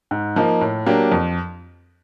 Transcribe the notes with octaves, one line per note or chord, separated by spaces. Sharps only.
G#2
F3 A#3 D#4
A2
F#3 A#3 D4 G4
F2